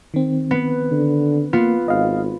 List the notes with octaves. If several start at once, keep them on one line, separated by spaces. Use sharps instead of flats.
D#3 C4
B3
D3
A#3 B3 F4
G#1 D#5 F5